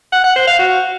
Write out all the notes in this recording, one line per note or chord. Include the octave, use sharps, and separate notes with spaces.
F#5
F#5
C5
F5
F#4